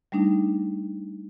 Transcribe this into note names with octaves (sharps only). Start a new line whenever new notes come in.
G3 A3 D4 D#4